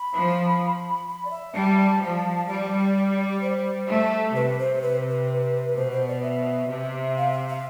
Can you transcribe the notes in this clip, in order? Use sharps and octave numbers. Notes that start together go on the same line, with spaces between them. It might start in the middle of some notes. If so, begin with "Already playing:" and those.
Already playing: B5
F3
B5
D5
E5
G3 A5
F3
G3 D5
C5
A3
C3 B4
C5
B4
B4
B2 C5
C5
D5
E5
C3
F5
E5
F5